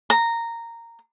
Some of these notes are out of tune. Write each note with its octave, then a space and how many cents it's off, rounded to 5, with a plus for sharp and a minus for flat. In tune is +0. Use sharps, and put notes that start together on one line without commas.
A#5 -10